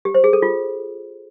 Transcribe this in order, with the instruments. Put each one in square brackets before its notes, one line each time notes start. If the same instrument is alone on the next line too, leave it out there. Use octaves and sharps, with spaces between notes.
[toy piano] G4
C5
G#4
A4
F4